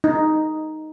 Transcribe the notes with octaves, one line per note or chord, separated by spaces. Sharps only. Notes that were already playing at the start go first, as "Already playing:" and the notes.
D#4